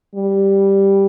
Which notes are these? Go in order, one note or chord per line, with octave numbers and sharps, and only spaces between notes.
G3